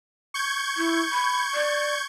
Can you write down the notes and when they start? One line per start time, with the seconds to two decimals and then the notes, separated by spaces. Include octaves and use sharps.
0.34 C#6 G6 G#6
0.77 E4
1.12 B5
1.55 D5